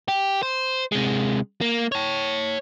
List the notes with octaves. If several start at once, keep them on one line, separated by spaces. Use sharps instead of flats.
G4
C5
C3 G#3
A#3
C#5 A5